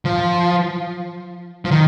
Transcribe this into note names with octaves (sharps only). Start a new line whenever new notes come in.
F3
F3
D#3